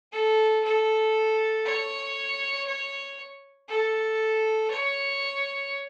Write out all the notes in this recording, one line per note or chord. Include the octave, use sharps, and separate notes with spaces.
A4
A4
C#5
C#5
A4
C#5